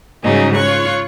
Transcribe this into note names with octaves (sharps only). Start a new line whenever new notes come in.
G#2 C#3 F#3 G3 D#4 G#4
F4 C#5 C#6 F#6